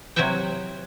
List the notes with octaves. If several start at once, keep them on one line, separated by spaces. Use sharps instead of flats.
C3 F#3 E4 F#4 E5 G5